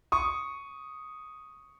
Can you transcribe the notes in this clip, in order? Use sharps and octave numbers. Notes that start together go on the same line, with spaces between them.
C#6 D#6